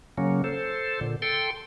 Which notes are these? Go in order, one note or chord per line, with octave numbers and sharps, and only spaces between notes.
C#3 F#3 A#3 C#4
A4 C5
A#2 D3
A4 G5 C6